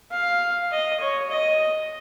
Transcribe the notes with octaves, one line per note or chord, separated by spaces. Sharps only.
F5
D#5
C#5
D#5